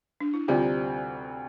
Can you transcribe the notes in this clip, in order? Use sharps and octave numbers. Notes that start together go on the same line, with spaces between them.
D4
E4
D2 C3 G3 C4 F4 G4